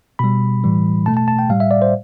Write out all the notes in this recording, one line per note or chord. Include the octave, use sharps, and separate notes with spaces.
B2 G3 B5
A2 E3 G3
B2 A3 A5
A5
A5
G5
A2 G3 F5
E5
D5
C5